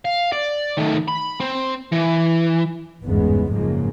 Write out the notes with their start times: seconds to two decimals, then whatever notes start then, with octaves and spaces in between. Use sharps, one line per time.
0.05 F5
0.32 D5
0.78 D#3 A3
1.08 B5
1.40 C4
1.92 E3
3.04 G1 E2 G#2 C#3 G#3 B3
3.53 F#1 G#2 C#3 F3 G#3 A#3